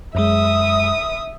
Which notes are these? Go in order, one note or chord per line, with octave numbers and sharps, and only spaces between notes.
F#2 G#3 E5 D#6